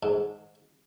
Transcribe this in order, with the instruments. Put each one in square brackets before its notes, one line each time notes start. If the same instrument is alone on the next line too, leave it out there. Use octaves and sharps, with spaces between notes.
[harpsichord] G#2